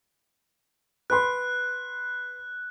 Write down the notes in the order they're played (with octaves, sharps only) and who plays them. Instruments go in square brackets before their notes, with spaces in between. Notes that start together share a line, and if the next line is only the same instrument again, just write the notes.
[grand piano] B4 B5 C6 [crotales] F#6